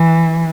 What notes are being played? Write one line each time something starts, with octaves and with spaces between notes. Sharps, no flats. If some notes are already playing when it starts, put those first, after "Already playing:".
Already playing: E3